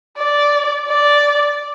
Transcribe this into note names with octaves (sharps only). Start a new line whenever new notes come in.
D5
D5